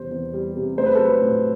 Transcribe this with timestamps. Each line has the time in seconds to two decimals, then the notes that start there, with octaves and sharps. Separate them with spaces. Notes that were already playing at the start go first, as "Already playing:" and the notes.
Already playing: E2 C3 G3 C5
0.11 E2
0.34 G3
0.56 C3
0.77 A3 C5
0.86 B4
0.95 A4
1.00 F#3 B4
1.22 A2